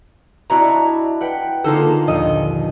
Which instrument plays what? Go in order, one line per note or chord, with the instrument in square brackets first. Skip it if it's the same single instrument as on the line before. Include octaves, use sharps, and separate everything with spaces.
[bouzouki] D4 E4 A#5 [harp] F#4 D#5
[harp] B4 F#5 G5
[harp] D3 D#4 F4 [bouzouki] A#3 G#4 A4
[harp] A#1 D#2 D#7 [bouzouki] A4 D#5